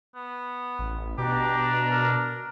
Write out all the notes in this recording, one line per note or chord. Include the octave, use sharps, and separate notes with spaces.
B3
A1
B2 D4 G4 A#5
A#4